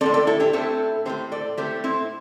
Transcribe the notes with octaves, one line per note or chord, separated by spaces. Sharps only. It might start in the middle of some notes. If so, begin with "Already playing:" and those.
A2 A3 C4 A4 D5
A4 D5
E4 A4
D4 G4
A2 A3 C4 E4 A4
A2 A3 C4 G4 C5
A4 D5
A2 A3 C4 G4 C5
C4 E4